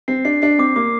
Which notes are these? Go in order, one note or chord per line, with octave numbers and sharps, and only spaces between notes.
C4 C7
D4 C7
D4 C7
C4 D6
A#3 D6